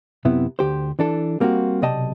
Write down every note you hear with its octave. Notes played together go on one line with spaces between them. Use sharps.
F#2 C3 B3 E4
D2 G4 C5
E3 D4 A4
G3 A#3 C4 E4 F#4
B1 C3 D5 D#5 G5 A5